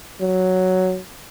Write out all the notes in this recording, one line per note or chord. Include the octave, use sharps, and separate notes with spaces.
F#3